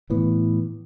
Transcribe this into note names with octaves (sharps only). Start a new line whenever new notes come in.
A2 E3 B3